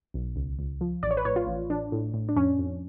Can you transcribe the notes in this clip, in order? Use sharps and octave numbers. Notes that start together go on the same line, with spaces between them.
B1
C#2
C#2
F3
A1 D5
C#5
B4
A2 C#5
F4
A1
A1 D4
A2
A2
D4
F2 C#4
F2